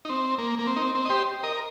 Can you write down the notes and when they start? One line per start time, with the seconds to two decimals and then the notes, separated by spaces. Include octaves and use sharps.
0.05 D#4
0.09 C4
0.38 A#3
0.59 A#3
0.67 C4
0.76 D#4
0.81 C4
0.95 C4
1.05 D#5
1.10 G4 C5
1.43 A#4 D#5